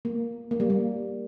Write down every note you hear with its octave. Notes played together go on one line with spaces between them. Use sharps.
A#3
A#3
G3
A#3